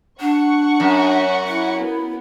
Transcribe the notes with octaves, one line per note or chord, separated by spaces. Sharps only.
D4 F#5 C#6
F#2
E4
A#3 B3